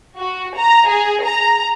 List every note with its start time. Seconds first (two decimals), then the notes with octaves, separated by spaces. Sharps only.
0.18 F#4
0.56 A#5
0.87 G#4
1.25 A#5